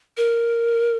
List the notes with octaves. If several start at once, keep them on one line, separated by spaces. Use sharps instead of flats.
A#4